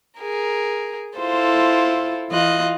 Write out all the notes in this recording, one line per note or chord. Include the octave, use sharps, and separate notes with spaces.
G#4 A#4
E4 F4 A4 C5
E3 F4 D#5 F#6